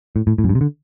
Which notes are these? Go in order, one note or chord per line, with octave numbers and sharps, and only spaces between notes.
A2
A2
A2
F#2
G2
C3
D3